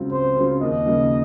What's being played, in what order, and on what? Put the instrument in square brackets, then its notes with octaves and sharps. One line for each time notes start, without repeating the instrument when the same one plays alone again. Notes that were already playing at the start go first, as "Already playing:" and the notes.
Already playing: [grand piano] C#2 C#3 F#3 C4 F4
[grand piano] C#2 [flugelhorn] C5
[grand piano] C#3 F#3 C4 F4
[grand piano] D#2 [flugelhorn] D#5
[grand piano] C#3 F3 A#3 D#4